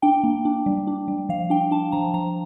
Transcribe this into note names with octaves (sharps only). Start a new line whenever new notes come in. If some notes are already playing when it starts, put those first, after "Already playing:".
D4 G5
A#3
D4
G3
D4
G3
F3 F5
D4 G5
D4 A5
F3 A#5
F3 A#5